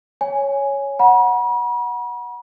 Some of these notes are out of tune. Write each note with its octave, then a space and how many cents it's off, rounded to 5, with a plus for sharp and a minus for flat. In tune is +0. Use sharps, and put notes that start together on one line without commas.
C#5 +0 G#5 +0
F#5 -10 B5 -45